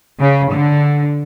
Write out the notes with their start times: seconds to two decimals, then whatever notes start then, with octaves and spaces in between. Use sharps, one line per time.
0.20 C#3
0.53 D3